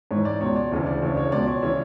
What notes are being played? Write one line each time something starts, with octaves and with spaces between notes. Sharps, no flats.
G#2 E3 C#5
D5
C#2 B2 C#5
D5
D2 C#3 E3
D5
D2 C#3 E3 C#5
C#5
C#2 B2 D5
C#5
C#3 E3 C#5